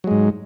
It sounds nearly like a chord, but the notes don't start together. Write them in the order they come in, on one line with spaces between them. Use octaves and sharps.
F#3 G#3 G#2